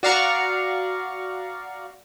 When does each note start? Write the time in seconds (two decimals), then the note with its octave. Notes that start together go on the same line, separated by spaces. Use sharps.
0.03 F#4 D5 F5 F#5 A#5 C#6